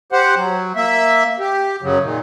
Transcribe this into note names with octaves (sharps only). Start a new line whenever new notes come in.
G4 C5 F#5
F#3
A#3 E5
G4
F#2 C#3 F#3
A#2 D#3